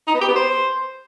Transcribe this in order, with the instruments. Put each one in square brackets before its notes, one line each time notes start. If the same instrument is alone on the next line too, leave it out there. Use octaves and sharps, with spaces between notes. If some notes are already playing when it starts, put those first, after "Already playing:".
[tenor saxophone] D#4
B3
G4
B3
C5